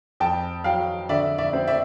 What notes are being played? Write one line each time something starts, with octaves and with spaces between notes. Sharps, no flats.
F2 G5 A5
F#3 F5 G5
D3 D5 E5
D5 E5
C4
D5 E5